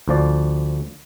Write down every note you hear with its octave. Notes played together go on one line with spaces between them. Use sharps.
D2 F3 D5